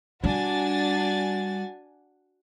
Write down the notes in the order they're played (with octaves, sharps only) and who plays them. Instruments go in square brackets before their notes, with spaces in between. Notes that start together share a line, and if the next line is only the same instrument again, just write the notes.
[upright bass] G3 [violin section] D4 G#5 A6 [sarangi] F#4